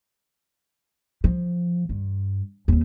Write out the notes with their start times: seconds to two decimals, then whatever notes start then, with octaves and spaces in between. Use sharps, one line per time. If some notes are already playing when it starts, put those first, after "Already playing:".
1.24 F3
1.89 G2
2.68 D#2 C4